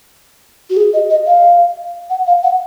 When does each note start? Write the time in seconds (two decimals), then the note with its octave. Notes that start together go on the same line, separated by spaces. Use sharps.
0.70 F#4
0.77 G#4
0.93 D#5
1.10 D#5
1.27 F5
2.10 F#5
2.27 F5
2.43 F#5